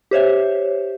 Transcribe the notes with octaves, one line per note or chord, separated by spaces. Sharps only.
G4 C5 C#5 E5